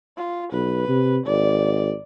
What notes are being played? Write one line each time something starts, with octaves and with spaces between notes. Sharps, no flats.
F4
B1 B4
C3
G#1 D5